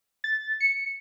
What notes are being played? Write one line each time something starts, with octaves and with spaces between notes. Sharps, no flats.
A6
C#7